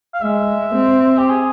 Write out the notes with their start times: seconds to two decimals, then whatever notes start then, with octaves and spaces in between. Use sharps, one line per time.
0.14 F5
0.22 G#3 E5
0.75 C4
1.18 G4
1.30 G#4